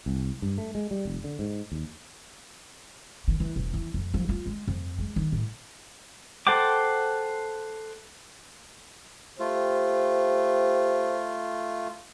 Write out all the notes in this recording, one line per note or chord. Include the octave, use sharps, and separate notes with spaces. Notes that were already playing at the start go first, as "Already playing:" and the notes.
C2
G2
A3
G#3
G3
F1
D3
G#2
D#2
D#3
E3
E1
E3
F2
F3
F4
G#3
F2
G#3
D#3
A2
A4 C5 F#5 G5 D6
A3 F4 G4 C5